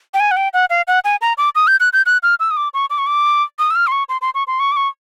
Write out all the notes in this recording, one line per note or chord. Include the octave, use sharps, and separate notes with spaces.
G5
G#5
F#5
G5
F#5
F5
F#5
G#5
A#5
D6
D#6
G6
F#6
G6
F#6
F6
E6
D#6
D6
C#6
D6
C#6
D6
D#6
E6
F6
C6
C#6
C6
C6
C#6
C6
C#6
D6
C#6